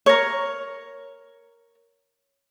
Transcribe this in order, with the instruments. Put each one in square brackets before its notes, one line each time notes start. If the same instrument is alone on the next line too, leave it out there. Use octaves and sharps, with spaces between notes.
[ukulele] A#4 C#5